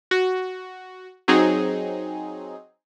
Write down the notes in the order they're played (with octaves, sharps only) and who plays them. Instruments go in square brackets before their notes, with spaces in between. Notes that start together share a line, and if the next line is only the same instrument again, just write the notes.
[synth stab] F#4
F#3 C4 D#4 G#4